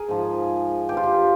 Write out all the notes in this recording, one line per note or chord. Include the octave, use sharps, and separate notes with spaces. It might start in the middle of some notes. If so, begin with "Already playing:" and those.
Already playing: G#4 A#4
G#2 F3
G2 F3 G4
F4
G4